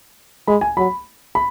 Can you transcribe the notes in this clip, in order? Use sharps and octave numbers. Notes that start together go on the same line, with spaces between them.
G#3 B5
G#5
F#3 B5
B5